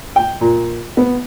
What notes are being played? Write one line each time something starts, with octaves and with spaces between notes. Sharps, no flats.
G5
A#2
B3